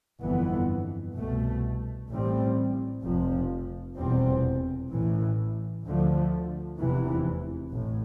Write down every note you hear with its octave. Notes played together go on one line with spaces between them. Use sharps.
G1 F2 E3 B3
C2 B2 A3
A1 A2 G3 C4
F1 F2 C3 F3
F1 E2 B2 G3 C4
A1 A2 E3
D2 D3 F3 A3
F1 E2 C3 E3
A1 A2